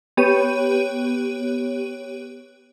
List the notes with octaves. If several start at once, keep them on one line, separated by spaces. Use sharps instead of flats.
B3 G4 C#5 D#7